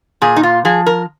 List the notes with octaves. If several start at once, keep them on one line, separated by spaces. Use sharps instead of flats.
A#2 G#4
D#4
F4
F3 G#4
A#4